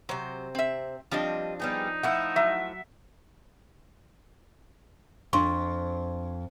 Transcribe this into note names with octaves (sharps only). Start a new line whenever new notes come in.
C3 F#3 C5
C4 E5
F3 G3 C4 D4 D#5
G3 B3 D#4 G#4
F3 A3 E4 F#5 E6
F#3 E5
F2 D4 C6 C#6